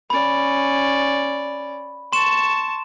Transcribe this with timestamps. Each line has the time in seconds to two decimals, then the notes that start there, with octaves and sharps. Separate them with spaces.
0.10 C#4 D5 B5
2.13 A5 C6 C#6 E7